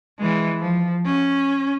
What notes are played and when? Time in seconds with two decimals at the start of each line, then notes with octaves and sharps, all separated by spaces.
0.19 E3 G#3
0.60 F3
1.06 C#4